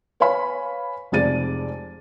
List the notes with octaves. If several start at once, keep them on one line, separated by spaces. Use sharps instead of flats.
B4 C#5 F5 G#5 B5
F1 F2 G#3 D5 A6 D#7